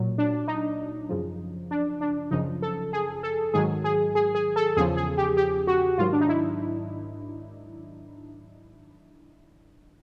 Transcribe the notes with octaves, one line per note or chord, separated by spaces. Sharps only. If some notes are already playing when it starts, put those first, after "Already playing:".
Already playing: A#2 F#3
D4
D#4
F#2 C#3 F3
D4
D4
F#2 C#3 F3 D#4
A4
G#4
A4
G#2 D#3 F#3 G#4
G#4
G#4
G#4
A4
E2 C#3 F3 G#4
G#4
G4
G4
F#4
G#2 D#3 F#3 F4
D4
D#4
E4